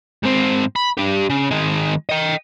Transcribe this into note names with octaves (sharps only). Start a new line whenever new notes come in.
G#2 C4
B5
D4 G4
C#3
D#3 G#3
D#5 G5